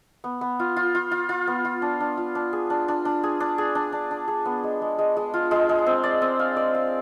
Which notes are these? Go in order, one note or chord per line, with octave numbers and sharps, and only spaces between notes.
B3
B3
F4
F4
F4
F4
F4
B3
F4
D4
D4
F4
D4
G#4
D4
D4
D4
G#4
D4
G#4
D4
D4
D4
G#4
B3
G#3
G#3
G#3
G#3
F4
G#3
G#3
C4
D5
C4
F5
D5
F5